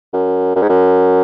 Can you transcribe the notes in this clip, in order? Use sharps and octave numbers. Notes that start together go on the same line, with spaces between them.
F#2
F#2
G#2
F#2